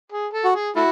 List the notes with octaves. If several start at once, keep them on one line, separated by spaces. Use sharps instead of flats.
G#4
A4
F#4
G#4
A3 E4 F#4